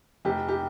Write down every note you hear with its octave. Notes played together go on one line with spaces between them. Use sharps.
F1 G4
G4